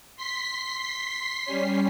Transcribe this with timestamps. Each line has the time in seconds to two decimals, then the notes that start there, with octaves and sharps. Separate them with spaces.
0.16 C6 B6 C7
1.45 G3 C#4